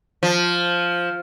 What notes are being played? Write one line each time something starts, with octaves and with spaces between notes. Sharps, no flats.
F3